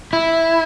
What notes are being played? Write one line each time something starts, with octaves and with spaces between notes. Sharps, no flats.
E4